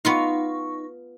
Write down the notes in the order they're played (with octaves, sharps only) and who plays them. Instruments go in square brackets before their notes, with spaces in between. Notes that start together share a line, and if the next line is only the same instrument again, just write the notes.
[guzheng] B3 F4 F5 [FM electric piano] D#4 C#6